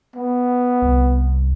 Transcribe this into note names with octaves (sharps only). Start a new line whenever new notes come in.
B3
C2